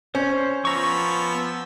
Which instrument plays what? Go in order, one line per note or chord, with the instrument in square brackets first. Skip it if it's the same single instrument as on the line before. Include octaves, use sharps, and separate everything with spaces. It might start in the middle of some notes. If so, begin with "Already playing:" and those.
[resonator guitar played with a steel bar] C#4 [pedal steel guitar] C5
[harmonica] F3 E6 [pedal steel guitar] B3 A#5 C#6